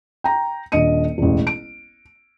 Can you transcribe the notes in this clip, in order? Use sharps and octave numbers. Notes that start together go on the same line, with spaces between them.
G5 A#5
D#1 D4 D#5 C#7 D#7
E1 A1
D7